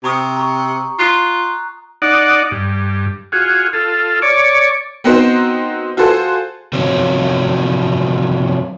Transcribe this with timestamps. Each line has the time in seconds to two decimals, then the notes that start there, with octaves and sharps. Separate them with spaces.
0.04 C3 A#5 C#6 D#6
0.37 A#5 C#6
0.99 F4 A#5 F#6
2.02 D#4 D5 F#5
2.51 G2
3.32 F4 F#4 G#4
3.73 F4 A4
4.22 C#5 D5
5.04 B3 C4 D#4 F#4 A#4 C5
5.97 F4 F#4 G#4 A4 C5
6.73 C3 F3 F#3 C4 C#4